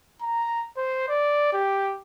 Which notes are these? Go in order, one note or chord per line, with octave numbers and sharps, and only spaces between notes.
A#5
C5
D5
G4